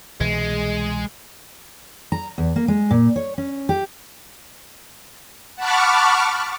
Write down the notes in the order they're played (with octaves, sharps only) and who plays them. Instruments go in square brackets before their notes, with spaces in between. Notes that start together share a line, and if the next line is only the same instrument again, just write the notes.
[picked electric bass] C2 B2 E3 [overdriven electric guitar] G#3
[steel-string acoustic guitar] A#5
E2
A#3
G#3
A#2
C#5
C#4
G4
[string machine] F#5 A5 B5 C#6 D6 F6